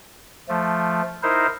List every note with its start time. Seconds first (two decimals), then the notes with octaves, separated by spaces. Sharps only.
0.49 F3 A3
1.23 D#4 E4 A#4 C5